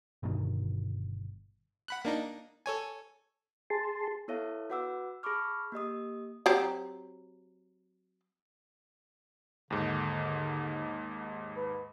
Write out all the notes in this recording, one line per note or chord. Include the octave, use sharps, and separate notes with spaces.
G1 G2 B2 D#3
F#5 B5 F#6
A#3 D4 D#4
A4 C#5 G#5
G#4 A5 C6
B3 E4 A4 C#5 E5 F5
F#4 B4 F#5 D6 E6
G#4 A5 B5 C#6 D6 F6
A#3 G4 D#5 D#6
F#3 C4 G4
D#2 G#2 D3
B4